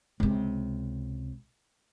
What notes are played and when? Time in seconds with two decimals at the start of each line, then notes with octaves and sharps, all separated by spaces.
0.20 C#2 C3